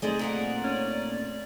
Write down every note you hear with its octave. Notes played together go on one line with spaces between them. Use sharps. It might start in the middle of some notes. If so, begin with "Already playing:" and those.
G#3 A3 C4 D#4 G#4 C5 D5
A#2 A#3 F#5
C#4